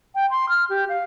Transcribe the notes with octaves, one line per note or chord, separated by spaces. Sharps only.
G5
C6
F6
G4
F5